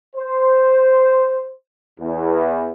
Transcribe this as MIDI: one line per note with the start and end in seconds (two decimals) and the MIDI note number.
0.16 1.50 72
2.00 2.73 40